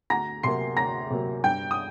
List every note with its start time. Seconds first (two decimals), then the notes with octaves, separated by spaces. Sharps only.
0.10 D2 A#5 A#6
0.43 C3 F#3 A#3 C6 C7
0.77 D2 A#5 A#6
1.10 C3 F#3 A#3
1.44 G2 G5 G6
1.71 D#6